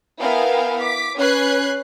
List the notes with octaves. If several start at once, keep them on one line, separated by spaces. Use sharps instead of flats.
B3 E4 A#4 F5 G5 G#5
D6 B6
C#4 B4 F#6 G#6 C7